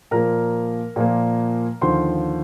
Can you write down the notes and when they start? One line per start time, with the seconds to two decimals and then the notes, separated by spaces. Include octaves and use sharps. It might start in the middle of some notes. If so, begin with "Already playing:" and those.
0.11 A#2 F3 A#3 A#4 A#5
0.96 A#2 F3 A#3
1.81 D#2 D3 F3 C5 C6